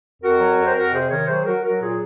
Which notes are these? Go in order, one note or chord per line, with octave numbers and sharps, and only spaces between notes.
F2 F#4 A#4
F#3
F2
C5
F2 F#4 A#4
C3 G#4 C5
D#3 A#4 C#5
F#3 G#4 C5
F#3 F#4 A#4
F#3 F#4 A#4
A#2 F4 G#4